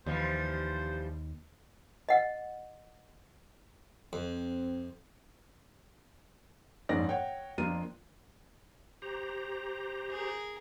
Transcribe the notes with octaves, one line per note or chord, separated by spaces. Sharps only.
D#2 E3 F3 G3 C5
D#5 F#5
F2 C4
F#1 F2 G#2 C#4 D5 A#6
C#5 F#5 G5
F2 A#3 D4 F4 D#7
G4 C5 A#5
G#4 A#4